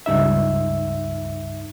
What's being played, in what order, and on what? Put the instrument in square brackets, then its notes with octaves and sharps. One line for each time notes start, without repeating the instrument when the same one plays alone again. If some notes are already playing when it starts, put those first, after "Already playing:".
[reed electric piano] C#2 G2 D#4 E5